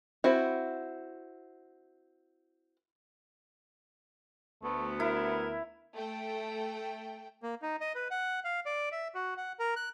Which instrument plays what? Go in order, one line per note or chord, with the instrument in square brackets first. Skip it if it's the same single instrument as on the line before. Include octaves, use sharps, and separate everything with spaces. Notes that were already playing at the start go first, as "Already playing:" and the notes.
[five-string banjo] C4 E4 F#4
[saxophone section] D2 B3 [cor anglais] A3
[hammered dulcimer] E4 [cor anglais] A#4
[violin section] A3 G5
[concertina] A#3
D#4
D#5
B4
F#5
F5
D5
E5
F#4
F#5
A#4
F#6